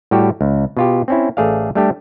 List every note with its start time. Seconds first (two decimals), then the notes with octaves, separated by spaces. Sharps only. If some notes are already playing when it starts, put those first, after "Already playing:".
0.11 A2 G3 F#4 G4
0.41 C#2
0.77 B2 F4 G4
1.08 C4 C#4 E4
1.37 A1 A3 G#4 D5 F5
1.75 G3 A3 D4 G4